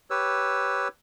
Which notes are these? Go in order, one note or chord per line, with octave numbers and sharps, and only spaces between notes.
G4 B4 C#5 E6